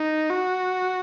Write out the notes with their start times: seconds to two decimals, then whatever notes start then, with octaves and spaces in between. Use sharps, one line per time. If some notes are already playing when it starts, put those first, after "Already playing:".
Already playing: D#4
0.30 F#4